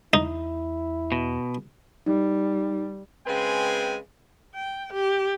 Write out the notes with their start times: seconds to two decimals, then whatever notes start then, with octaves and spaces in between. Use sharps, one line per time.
0.13 E2 D#4 E4
1.12 B2
2.06 G3 D#4
3.27 C#3 G#3 C4 B4 G5 G#5
4.55 G5
4.93 G4